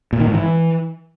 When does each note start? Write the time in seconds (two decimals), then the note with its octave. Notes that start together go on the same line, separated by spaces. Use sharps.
0.13 A#2
0.20 D#3
0.27 G#2
0.34 E3